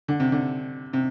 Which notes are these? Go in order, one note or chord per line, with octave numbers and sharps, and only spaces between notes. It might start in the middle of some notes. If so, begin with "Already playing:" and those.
D3
C3
D3
C3